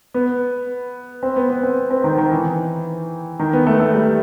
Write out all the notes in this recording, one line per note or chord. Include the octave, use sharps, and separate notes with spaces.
B3
C4
B3
B3
C4
C4
D#3
D#3
E3
D#3
B3
A3
A3
G3